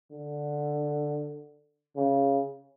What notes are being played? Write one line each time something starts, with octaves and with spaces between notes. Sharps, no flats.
D3
C#3